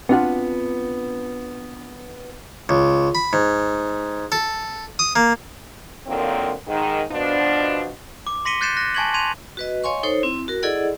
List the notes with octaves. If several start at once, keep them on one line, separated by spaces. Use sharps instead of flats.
B3 C4 D4 F4 F#4 F#5
C#2
B5
G#2
A4
D#6
A#3
D3 D#3 F3 F#3 A#3 C4
G#2 D#3
B2 F3 D4
D6
C6 A#6 B6 C#7 D#7 G7
F#6 G6 A6 C7 C#7 E7
F#6 A#6
G#5 A5 C#6 G#6 B6 F#7
C6 G#6 D#7 F7
F#4 B4 D#5
C#5 D#5 F5 G#5 C6 C#6
D#4 A4 C5 C#5
C4 E4
F#4 A#4
E4 G#4 A4 D5 D#5 F#5